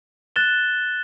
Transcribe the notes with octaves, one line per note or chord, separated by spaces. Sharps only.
F#6 A6 E7 G7